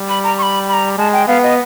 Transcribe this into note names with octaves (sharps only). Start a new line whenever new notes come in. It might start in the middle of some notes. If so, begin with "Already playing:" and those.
Already playing: G3
B5
A#5
C#6
B5
B5
A#5
G#3 A5
G5
B3 F5
D#5